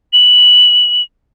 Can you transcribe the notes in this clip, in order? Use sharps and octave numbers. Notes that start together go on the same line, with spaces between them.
F#7